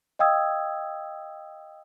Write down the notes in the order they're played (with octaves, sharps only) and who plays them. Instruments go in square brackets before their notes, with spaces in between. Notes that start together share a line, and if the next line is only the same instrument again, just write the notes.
[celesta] D#5 F5 G5 D#6 E6 G#6